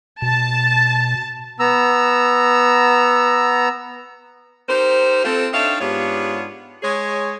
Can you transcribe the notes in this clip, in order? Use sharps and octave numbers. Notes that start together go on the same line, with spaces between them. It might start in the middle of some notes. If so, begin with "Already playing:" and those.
B2 A5
B3 A#5 E6
D#4 G4 A#4 C5
C4 F4 A4
C4 D4 D#4 C#5 E5 F5
G#2 B3 D4 F4 G4 C#5
G#3 G#4 C#5